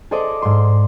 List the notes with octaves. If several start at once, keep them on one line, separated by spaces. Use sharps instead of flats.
G#4 A4 C5 D5 D#5
G#2 C6